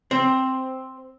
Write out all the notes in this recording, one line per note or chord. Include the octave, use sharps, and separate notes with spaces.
C4